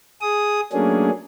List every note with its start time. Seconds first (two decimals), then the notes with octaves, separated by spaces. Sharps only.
0.21 G#4 D#6
0.73 F#3 A3 A#3 C#4 D4 G#4